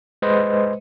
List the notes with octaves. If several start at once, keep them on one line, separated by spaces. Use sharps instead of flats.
G#3 B4 C5 D#5